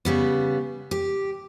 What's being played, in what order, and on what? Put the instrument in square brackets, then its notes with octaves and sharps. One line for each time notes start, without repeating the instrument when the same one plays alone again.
[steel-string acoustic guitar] C#3 G3 B3
G4